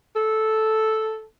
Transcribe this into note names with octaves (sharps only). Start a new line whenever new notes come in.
A4